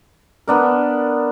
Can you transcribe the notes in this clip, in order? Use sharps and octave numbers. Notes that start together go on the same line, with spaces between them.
B3 D4 A#4